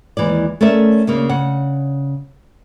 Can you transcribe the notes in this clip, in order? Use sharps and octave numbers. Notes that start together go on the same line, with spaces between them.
D#2 E3 G#3 D5
A3 C#4 A#4 D5 E5
D2 C#3 A#3
C#3 F#5